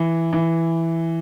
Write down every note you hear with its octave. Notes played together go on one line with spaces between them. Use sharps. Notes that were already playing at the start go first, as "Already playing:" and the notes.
Already playing: E3
E3